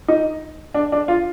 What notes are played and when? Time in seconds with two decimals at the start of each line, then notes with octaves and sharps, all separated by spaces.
0.08 D#4
0.74 D4
0.92 D4
1.08 F4